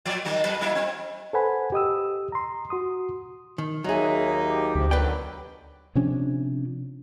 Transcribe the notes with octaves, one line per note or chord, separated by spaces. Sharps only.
A#2 F3 D5
D#3 F#3 A#3
F2 F#3 B4
F#3 A#3 E4
C4
A4 B4 C5 F#5 G#5 B5
G4 D#5 D#6 E6
A#5 C6
F#4 C6 D#6
D#3
D#2 F#3 D#4 G#4 C#5 E5
G4
D2 G#2 C3 F3
D3 D#3 F#3 B4 D5 G5
C3 F3 C#4 D4